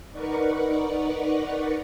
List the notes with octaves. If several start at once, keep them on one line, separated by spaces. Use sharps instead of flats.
D#4 A#4 B4 D5 F#5 C#6